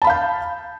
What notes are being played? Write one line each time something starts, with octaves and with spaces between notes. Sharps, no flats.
F5 A5 B5 G6